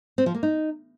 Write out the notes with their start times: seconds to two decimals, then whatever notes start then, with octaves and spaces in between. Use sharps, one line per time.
0.18 C4
0.26 F3
0.35 A#3
0.43 D#4